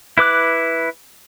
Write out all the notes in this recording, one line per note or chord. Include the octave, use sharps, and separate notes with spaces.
E4 B4 D6 F#6